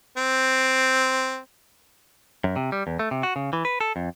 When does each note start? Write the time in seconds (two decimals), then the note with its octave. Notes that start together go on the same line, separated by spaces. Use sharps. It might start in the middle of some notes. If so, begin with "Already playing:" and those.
0.17 C4
2.44 F#2
2.56 C3
2.72 G3
2.87 E2
2.99 A3
3.11 C3
3.23 F#4
3.36 C#3
3.53 E3
3.65 B4
3.81 A4
3.96 F2